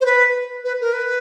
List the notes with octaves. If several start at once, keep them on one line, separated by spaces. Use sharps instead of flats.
C5
B4
B4
A#4
B4